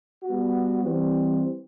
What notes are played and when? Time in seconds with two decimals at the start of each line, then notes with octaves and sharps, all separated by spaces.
0.24 G3 B3 F#4
0.83 E3 G3 C4